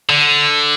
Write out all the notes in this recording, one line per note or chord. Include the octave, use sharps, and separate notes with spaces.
D3